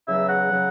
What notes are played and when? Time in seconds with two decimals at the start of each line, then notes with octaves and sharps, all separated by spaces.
0.07 E2 C#3 F#3 E5
0.29 F#5
0.50 C#3 F#3